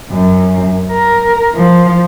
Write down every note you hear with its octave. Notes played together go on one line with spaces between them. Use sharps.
F#2
A#4
F3